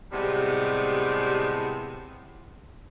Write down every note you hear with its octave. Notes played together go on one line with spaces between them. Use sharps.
A2 C3 G3 G#3 B3